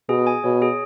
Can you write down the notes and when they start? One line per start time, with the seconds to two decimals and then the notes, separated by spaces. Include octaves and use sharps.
0.09 B2 G#4
0.27 G#5
0.44 B2 C#5
0.62 G#4